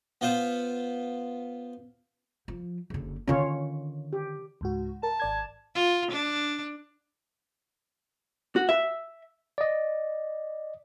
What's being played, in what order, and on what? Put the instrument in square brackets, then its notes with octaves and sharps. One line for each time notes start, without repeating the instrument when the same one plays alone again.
[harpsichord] B3 F4 C5 F5
[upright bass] F3
F#1 D3
[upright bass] D3 D#3 [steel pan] C#4 F4 C#5
[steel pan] G4
[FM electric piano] C#2 G#2 F#4
[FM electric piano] A#4 [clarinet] A5
[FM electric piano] G#1 D5 G#6
[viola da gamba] F4
D4
[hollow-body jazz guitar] F#4
E5
[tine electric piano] D5 D#5